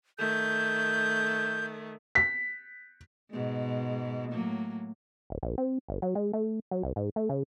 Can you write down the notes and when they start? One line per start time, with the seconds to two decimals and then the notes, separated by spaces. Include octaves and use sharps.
0.19 D#3 A3 G6
2.15 B6
3.31 G#2 B2 G#3
4.30 A2 F#3 A#3
5.30 D1
5.43 A#1
5.58 C4
5.88 G1
6.02 F#3
6.15 G#3
6.33 A3
6.71 F#3
6.83 C2
6.96 G#2
7.16 A3
7.29 C#3